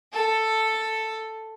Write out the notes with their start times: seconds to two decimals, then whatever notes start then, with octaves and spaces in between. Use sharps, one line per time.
0.13 A4